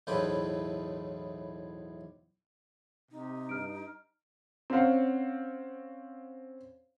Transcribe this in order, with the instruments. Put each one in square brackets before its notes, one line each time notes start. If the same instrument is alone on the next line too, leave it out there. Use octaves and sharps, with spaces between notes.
[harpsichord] B1 E2 A2 C4 B4 G5
[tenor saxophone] C3 [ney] D#4
[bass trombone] G2 [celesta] F6 D7
[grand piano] C4 C#4 F5 F#5